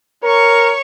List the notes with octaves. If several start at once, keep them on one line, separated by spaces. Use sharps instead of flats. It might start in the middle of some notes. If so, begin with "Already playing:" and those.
A#4 C#5 C#6